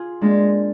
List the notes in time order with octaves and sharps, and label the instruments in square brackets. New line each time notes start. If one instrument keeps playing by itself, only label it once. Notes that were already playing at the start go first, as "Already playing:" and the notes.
Already playing: [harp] F4 G#4
[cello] G#3 [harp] A#3 D4